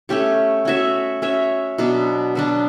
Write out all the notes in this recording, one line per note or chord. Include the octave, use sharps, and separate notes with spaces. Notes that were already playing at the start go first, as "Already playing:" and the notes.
A3 C#4 G4 C#5
C#4 F#4 C#5 E5
C#4 F#4 C#5 E5
B2 F#3 B3 D4
B2 F#3 B3 D4